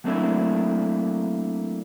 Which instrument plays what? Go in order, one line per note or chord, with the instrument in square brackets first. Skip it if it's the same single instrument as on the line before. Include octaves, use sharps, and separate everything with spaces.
[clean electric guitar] F#3 A3 A#3 C4 D4 E4